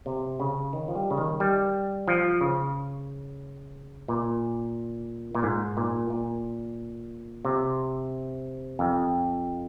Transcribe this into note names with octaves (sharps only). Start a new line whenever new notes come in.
C3
C#3
D#3
F3
G3
C#3
D#3
G3
F3
C#3
A#2
A#2
G#2
A#2
A#2
C3
F2